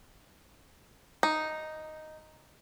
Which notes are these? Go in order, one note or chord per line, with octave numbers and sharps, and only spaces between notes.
D#4